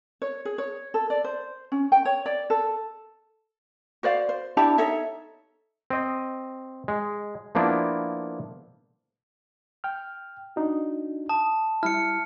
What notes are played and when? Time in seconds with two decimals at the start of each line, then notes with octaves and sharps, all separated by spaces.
0.22 C#5
0.45 G#4
0.58 C#5
0.94 A4
1.10 D5
1.24 C5
1.72 C#4
1.92 G5
2.05 C#5
2.26 D5
2.50 A4
4.03 F#4 C5 D5 F5
4.29 C5
4.57 D4 E4 G4 A5
4.78 D#4 A4 C#5 E5
5.90 C4 D#5
6.88 G#3
7.55 F3 A#3 B3 D4 E4
9.84 G5 F6
10.56 D4 D#4 F#4
11.29 A5 D#6
11.83 G3 E4 F6 C#7